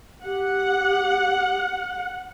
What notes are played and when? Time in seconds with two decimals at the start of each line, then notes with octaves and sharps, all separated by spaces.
0.25 G4 F#5